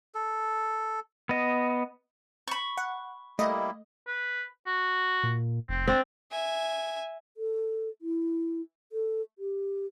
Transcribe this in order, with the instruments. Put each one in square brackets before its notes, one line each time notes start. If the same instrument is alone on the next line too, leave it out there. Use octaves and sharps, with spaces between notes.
[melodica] A4
[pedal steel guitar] B3 D#5
[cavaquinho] B5 C#6
[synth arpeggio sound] F#5
[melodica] G3 A#3 E4 [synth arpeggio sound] A3 D#5
[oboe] B4
F#4
[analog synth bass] A#2
[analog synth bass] F1 [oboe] C4
[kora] C4 [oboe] D4
[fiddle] E5 G#5
[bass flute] A4
E4
A4
G4